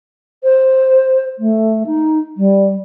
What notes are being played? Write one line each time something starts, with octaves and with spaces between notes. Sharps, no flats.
C5
A3
D#4
G3